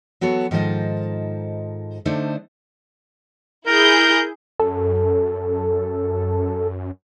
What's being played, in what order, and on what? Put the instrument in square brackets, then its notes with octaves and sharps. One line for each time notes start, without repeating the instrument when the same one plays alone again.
[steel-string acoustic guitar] F#3 B3 F#4 A4 C#5
G#2 D#3 F3 A4 C5 D#5
D3 A3 D4 D#4 C5
[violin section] E4 G#4 G6 [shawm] A#4
[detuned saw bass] F#2 [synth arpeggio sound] A4